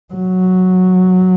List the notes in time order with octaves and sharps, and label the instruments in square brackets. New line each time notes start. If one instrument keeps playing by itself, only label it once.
[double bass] F#3